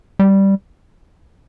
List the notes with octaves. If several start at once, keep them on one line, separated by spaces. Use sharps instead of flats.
G3